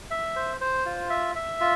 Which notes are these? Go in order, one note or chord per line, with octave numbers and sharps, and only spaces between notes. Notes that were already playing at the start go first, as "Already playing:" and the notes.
E5
C5
C5
F4
E5
E5
F4